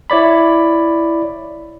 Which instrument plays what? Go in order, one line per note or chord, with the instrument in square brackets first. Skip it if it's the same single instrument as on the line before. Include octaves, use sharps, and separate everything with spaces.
[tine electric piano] E4 C#5 D5 B5